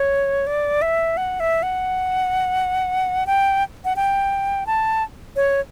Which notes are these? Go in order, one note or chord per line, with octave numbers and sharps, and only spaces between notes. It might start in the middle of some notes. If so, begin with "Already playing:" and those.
Already playing: C#5
D5
E5
F#5
E5
F#5
G5
F#5
G5
A5
C#5